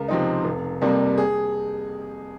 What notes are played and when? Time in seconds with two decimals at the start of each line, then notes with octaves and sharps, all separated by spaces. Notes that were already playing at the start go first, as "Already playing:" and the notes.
Already playing: C#2 A#4
0.08 C3 F3 C4 D#4
0.45 F1
0.81 F2 C3 G3 A#3
1.18 G#4